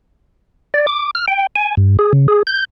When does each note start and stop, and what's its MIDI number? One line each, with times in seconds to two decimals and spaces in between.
0.74 0.86 74
0.87 1.11 86
1.15 1.26 89
1.28 1.47 79
1.56 1.75 80
1.77 1.97 43
1.99 2.13 68
2.13 2.27 49
2.28 2.43 68
2.47 2.65 91